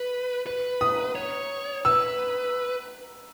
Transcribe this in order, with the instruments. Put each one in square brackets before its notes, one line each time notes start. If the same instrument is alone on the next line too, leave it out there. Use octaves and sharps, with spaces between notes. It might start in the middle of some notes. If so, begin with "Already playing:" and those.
Already playing: [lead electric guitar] B4
B4
[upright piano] D#6
[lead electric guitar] C#5
[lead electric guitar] B4 [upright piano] E6